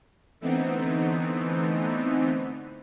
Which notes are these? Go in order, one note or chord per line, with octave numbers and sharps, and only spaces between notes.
D3 E3 A3 B3 C4 D#4